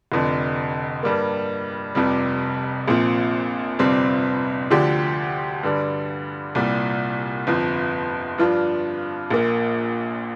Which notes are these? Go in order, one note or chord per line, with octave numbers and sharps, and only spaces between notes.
F1 F2 D3
G2 G3 A#3
F1 F2 C3 G3
A#1 A#2 F3 C4
G1 F2 C3 G3 C4
D2 D3 F3 D4 G4
G2 D3 G3
C2 A#2 G3
G1 F2 F3
G2 F3 D4 F4
A#1 A#2 A#3